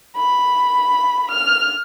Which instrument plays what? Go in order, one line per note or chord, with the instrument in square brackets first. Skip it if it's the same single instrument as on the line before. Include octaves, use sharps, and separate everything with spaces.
[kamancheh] B5
F6